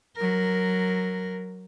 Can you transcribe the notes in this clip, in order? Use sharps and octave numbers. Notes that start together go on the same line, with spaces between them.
F#3 A#4